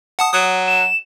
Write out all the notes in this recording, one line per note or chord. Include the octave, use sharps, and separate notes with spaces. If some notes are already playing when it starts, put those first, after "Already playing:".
F#5 A5 D#6
F#3 D#6
E7